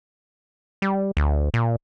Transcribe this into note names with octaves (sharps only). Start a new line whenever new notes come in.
G3
D2
A#2